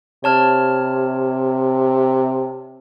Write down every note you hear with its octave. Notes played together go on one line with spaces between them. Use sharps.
C3 C#5 A5 F6